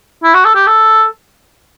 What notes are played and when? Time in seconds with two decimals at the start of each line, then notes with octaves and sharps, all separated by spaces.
0.24 E4
0.34 F#4
0.45 A4
0.55 G4
0.67 A4